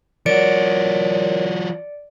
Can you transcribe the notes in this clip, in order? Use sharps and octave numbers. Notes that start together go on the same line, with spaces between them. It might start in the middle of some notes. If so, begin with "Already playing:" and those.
F3 F#4 A#4 C#5 D5 C#7 D7